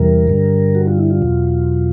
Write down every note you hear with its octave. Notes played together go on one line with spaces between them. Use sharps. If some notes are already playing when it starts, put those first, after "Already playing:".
Already playing: E2 C3 E3 G3 A#4
G2 D3 G3
F#4
F4
E4
F4
E2 B2 F#3